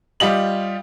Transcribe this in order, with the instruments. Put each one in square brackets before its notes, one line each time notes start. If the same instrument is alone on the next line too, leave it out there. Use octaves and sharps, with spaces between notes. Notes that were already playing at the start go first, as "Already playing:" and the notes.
[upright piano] G3 F4 G4 D#5 F#7